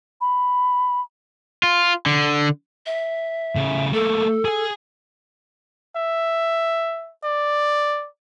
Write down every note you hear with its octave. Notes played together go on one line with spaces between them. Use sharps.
B5
F4
D3
E5
A2 C#3
A3 A#3 A4
G#4 G#5
E5
D5